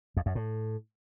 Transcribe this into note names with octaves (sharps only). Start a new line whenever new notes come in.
F2
F#2
A2